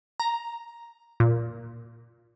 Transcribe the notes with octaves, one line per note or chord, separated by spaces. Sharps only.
A#5
A#2